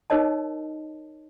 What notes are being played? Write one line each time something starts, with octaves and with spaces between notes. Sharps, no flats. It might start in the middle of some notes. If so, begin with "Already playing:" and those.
D#4 A#4 C#5 D#5 A5